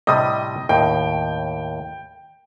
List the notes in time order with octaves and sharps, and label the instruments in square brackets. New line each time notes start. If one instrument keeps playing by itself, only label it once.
[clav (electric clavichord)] A2 C3 G3 [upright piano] D#5 D#6
[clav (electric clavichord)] D#2 A2 [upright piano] G5